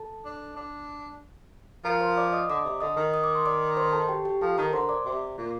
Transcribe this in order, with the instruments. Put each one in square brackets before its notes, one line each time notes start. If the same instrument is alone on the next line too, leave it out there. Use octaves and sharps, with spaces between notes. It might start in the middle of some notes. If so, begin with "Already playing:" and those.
Already playing: [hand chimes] A4 A5
[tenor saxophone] D4
D4
[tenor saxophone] F3 [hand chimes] A#4 A#5
[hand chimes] C5 C6
D5 D6
D#5 D#6
[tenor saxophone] D3 [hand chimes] D5 D6
[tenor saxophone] C3
[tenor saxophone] D3 [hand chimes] D#5 D#6
[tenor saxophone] D#3
[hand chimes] D#6
D6
C6
D5 D6
C5 C6
A4 A5
G4 G5
G4 G5
[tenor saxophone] F3 [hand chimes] A4 A5
[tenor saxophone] D#3 [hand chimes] A#4 A#5
[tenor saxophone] D3 [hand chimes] C5 C6
[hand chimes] D5 D6
[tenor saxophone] C3
A#2